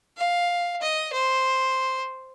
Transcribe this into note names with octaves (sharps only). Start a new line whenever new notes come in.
F5
D#5
C5